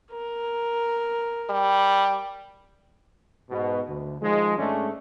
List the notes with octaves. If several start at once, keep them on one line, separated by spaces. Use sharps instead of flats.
A#4
G3
G#2 B2
D2
D#3 F3 G#3
G#2 G#3 A3 C#4 D4